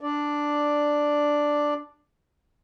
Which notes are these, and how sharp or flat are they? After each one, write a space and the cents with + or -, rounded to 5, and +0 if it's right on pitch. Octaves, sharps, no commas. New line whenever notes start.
D4 +0 D5 +0